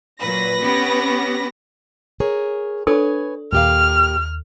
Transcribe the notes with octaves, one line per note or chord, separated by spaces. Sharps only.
A#2 F#3 B4 A#6
B3 C#4 G4
G#4 A#4 C#5
D4 A4 B4 C#5 G#5
D#2 A#2 G4 F5 F6